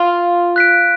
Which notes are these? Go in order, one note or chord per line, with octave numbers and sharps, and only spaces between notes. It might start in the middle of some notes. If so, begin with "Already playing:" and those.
Already playing: F4
F#6 B6 D7